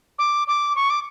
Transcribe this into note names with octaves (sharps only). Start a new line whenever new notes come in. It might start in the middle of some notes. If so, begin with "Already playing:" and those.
D6
D6
C#6
D6